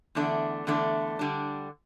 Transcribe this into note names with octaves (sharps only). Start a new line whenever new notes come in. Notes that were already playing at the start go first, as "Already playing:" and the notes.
E2 D3 A3 D4
E2 D3 A3 D4
D3 G3 D4